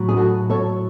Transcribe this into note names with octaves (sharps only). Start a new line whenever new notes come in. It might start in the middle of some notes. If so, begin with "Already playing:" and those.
Already playing: A2 F#3
G#4
F#4 A4
A4 C#5